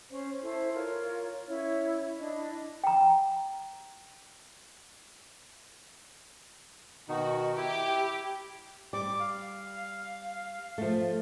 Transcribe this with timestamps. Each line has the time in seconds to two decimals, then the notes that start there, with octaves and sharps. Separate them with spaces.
0.10 C#4 C5 C#5
0.43 E4 A4 C5
0.74 F4 A#4 C#5
1.47 C#4 E4 C#5
2.19 D4 E4 D#5 B5
2.84 G5 A#5
7.09 B2 D#3 D#4 F#4
7.57 E4 G4
8.93 G3 D6
9.19 F5
10.78 F3 A3